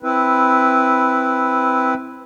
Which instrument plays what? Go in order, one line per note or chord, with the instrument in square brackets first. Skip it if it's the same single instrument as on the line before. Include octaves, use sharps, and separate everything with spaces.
[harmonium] C4 E4 B4